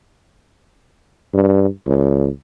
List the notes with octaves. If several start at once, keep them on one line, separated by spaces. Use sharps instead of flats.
G2
C#2